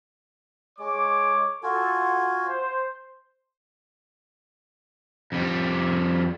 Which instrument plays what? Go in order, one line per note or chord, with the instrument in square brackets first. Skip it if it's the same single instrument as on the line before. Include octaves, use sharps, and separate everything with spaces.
[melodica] G#3 [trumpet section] C#5 D6
[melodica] F4 F#4 G#5 [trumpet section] A4
[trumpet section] C5
[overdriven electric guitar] F2 G3